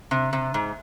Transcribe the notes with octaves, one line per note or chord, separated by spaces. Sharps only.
C3
C3
G#2